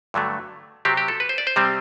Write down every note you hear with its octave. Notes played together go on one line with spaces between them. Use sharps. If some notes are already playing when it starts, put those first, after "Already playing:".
G2 D3 F#3 A3
C3 F#3 C4 G4
G4
A4
B4
C5
D5
C5
C3 G3 C4